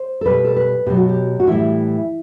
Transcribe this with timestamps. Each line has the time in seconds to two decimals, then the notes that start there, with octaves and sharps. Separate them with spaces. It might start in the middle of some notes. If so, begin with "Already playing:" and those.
Already playing: C5
0.21 A4
0.25 B2 G3 B4
0.45 A4
0.57 B4
0.86 B2 F#3 G4
0.97 F#4
1.09 G4
1.40 F#4
1.47 A2 E3 G3 E4